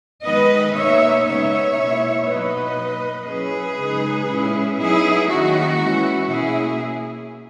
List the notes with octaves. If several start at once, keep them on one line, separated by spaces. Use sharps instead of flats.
D#3 G#3 B3 B4 D#5
B2 A#3 D#4 C#5 E5
C#3 G#3 B3 D#4 C#5 E5
B2 A#3 E4
B2 F#3 B3 D#4 B4 D#5
F#3 A#3 D#4
F#3 C#4 E4 G#4 B4
C#3 G#3 D#4
A#2 G#3 C#4 E4
F#3 B3 D#4 E4 G#4
D#3 A#3 C#4 E4 F#4
E3 G#3 C#4 E4
B2 A#3 C#4 E4 G#4